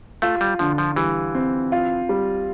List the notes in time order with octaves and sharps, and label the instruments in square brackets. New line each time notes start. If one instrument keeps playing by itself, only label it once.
[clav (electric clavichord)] A3 [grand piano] F4
[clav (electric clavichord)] G3
[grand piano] D3 [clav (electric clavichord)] F3
[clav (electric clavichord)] F3
[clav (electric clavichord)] E3 [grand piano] G3
[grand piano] C4
F4
G3